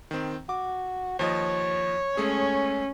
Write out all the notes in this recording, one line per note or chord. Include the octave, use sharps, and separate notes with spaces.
D#3 C4
F#4 D6
D#2 F3 C#5 D#5
G#3 A3 C#4 G#4